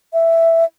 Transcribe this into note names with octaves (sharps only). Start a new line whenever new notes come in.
E5